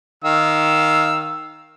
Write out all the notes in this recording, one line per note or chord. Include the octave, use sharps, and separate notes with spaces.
D#3 F5 E6